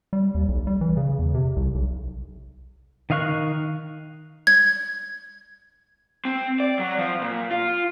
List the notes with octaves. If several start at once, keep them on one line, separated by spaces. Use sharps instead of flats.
G3
D#2
B1
G3
E3
C#3
E2
C3
C2
B1
D#3 D#5 F5 C#6 F#6
G#6
C4
D5
F#3
F3
A#2
F4